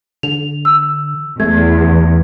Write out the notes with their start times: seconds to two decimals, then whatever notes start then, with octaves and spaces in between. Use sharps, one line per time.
0.23 D3 F7
0.65 E6
1.40 E2 A3 G#6